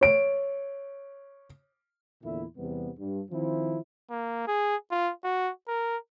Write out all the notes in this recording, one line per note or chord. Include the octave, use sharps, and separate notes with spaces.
C#5 D7
E2 A#2 D3 E4 E5
E2 C3 G3 B3
G2
D#3 F3 C4 E4
A#3
G#4
F4
F#4
A#4